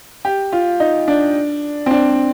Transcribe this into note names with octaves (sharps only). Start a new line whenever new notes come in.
G4
F4
D#4
D4
C4
D4